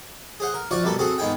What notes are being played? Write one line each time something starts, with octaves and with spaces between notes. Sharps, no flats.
G#4 C5 F#5
A#4
F3 F4 F#4 D5 C#6
B2 G3 A#3 A4
C4 F#4 G#4 A4
G#2 D#3 B3 G#4 G5